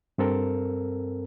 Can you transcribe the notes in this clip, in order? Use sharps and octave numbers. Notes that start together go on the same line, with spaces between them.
G2 C4 A4 A#4